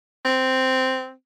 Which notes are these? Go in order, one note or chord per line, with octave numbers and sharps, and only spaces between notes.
C4